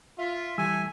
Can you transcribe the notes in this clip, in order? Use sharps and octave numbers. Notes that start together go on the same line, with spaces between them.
F4 E5
E3 G3 A3 G#5 E6